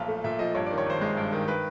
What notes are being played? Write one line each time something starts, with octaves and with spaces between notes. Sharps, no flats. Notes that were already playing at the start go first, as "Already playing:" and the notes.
Already playing: B1 A#2 F3 E5 F5
A3
A#2 E5
F3 D#5
G2 C#5
D5
D#3
C#5
G#1 C5
G#3
G2
D#3
B4